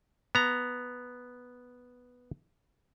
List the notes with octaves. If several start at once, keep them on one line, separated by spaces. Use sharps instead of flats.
B3 A#5